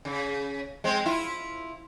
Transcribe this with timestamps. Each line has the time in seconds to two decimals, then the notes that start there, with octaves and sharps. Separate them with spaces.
0.05 C#3
0.84 G#3 C4
1.06 E4 F4